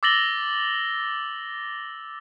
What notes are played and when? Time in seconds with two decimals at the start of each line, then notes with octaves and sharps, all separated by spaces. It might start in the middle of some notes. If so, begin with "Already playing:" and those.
0.03 D6 E6 A6 A#6 F#7 G7